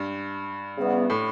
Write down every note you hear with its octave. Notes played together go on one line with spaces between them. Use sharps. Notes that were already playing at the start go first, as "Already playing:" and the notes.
Already playing: G2
C#3 E3 G3 B3
A2